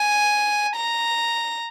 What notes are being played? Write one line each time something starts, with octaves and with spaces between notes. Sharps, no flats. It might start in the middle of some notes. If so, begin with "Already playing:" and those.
Already playing: G#5
A#5